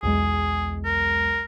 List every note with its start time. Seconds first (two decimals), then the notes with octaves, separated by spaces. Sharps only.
0.03 B1 E2 G#3 G#4
0.85 A#4